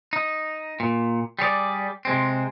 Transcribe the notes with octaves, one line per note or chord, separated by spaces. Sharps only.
D#4
A#2
G3 G#4 C#5 D5
C3 G#3 C4